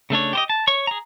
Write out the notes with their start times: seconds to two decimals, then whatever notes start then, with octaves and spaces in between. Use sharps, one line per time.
0.10 C#3 A3 D4 C#5
0.33 G4 C5 D#5
0.50 A5
0.68 C#5 C#6
0.87 G#4 A#5